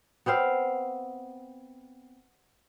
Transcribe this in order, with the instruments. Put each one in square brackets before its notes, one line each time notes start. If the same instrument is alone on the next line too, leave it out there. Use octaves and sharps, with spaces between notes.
[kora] B3 C4 C5 F5